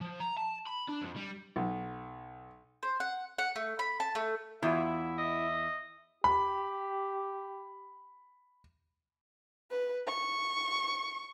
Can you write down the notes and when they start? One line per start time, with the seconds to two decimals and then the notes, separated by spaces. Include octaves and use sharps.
0.01 F3
0.20 A#5
0.37 A5
0.67 B5
0.89 D4
1.02 F2
1.17 G3
1.56 B1
2.83 C5
3.00 F#5
3.38 F#5
3.56 A3
3.79 B5
4.00 A5
4.15 A3
4.63 E2 E4 F4 E5
5.18 D#5
6.24 G4 B5
9.71 B4
10.07 C#6